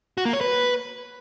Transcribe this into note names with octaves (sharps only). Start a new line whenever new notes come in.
F#4
A#3
C#5
B4